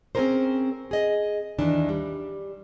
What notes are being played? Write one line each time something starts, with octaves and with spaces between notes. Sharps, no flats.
C4 C#4 F4 G#4 A#4 C5
G#4 D#5
D#2 D#3 E3 D4
G3